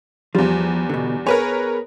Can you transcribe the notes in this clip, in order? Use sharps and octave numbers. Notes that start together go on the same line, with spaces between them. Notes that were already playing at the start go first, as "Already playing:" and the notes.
E2 F3 G3
B2 D3
B3 G#4 A#4 B4 C#5